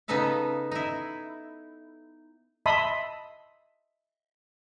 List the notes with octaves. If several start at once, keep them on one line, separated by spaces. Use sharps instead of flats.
C#3 B3 D#4 A4 B4 F5
D#4 E4
D#5 E5 A5 B5 C6 D#6